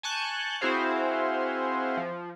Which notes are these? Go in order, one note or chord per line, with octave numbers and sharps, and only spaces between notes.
G#5 A5 C#6 F#6 G6
C4 E4 F#4 G#4 C5 F5
F3